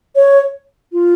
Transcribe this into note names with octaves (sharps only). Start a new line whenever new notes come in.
C#5
F4